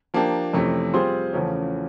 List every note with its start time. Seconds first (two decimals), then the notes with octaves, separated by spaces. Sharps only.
0.14 F3 A#3 D4 G4
0.53 F2 C3 E3 A3 C#4
0.93 G3 C4 F4 G#4 C5
1.33 E2 C#3 F3 A3 C#4